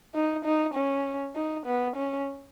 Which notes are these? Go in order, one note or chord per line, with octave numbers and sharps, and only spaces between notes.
D#4
D#4
C#4
D#4
B3
C#4